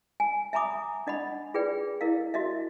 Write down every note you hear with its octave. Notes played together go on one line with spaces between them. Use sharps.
G#5
E5 G#5 A#5 B5 D6 D#6
D4 D#5 F#5 B5
F4 G#4 B4 D5 G5
E4 A#4 D#5 F5
F#4 D#5 E5